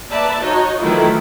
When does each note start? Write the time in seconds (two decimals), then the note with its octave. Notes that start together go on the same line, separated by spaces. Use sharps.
0.10 A#3 B4 D5 E5 A5
0.42 D#4 F#4 C#5 D#5
0.79 D#3 E3 F#3 A3 E4 F4